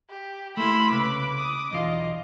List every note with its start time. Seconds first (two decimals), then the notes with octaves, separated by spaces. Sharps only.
0.10 G4
0.57 A3 A#3 E4 B5 C6 E6
0.91 C2 C#3 B4 D6
1.38 D#6
1.71 B1 E2 F4 D#5